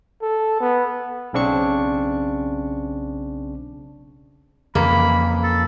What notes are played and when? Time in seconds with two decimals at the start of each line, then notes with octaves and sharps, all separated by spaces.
0.22 A4
0.60 B3
1.33 B1 C#3 C4 D4 C#6 C#7
4.75 F2 C#3 E3 A#3 B5
5.43 A4